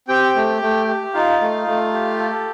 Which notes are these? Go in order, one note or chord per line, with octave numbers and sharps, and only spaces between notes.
C4 G4 G5
A3
A3
G4
D#4 F4 F5
A3
A3
G4
A4